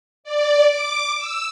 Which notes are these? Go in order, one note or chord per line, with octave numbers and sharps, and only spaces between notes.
D5
D6
E6